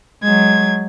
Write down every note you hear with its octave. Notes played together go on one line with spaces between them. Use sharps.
F#3 G#3 G#6